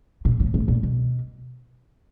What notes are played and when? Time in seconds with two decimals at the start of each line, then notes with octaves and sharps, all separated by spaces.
0.25 A#2
0.40 A2
0.54 A2
0.68 A#2
0.83 B2